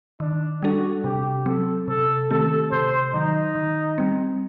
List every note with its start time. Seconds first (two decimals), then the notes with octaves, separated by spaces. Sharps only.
0.20 D#3 D4
0.62 G3 D4 F#4 A4
1.04 C3 G4
1.46 F#3 C4 A4
1.88 C3 A4
2.31 D#3 A3 C4 G4 A4
2.71 C3 C5
3.14 D#3 F#3 D#4
3.55 D#3
3.98 G3 C4